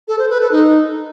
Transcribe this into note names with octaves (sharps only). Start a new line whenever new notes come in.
A4
C5
B4
A4
D#4